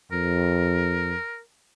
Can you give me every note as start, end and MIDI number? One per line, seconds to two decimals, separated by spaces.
0.12 1.15 41
0.12 1.40 70